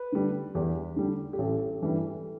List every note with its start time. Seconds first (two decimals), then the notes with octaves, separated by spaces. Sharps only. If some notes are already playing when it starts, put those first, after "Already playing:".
Already playing: B4
0.12 D3 G3
0.55 E2 G4
0.96 D3 G3
1.33 G4
1.38 A1 A4
1.81 G2 E3 G3